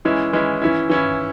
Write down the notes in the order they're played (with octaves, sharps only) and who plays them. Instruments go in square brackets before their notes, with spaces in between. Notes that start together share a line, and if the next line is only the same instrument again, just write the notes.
[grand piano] E3 G#3 C#4 E4
E3 G#3 C#4 E4
E3 C#4 E4
E3 C#4 E4